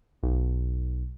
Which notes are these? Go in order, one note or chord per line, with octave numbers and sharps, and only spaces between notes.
B1